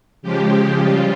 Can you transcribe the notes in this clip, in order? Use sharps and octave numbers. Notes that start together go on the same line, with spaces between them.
C#3 F3 G#3 G4
C#3 G3 F4